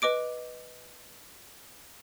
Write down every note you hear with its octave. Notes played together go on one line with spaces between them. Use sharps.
B4 D#5 D6 D7